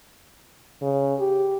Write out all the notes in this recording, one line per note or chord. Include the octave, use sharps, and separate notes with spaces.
C#3
G4